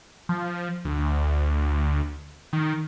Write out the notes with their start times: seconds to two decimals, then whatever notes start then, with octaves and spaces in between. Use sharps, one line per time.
0.29 F3
0.85 D2
2.53 D#3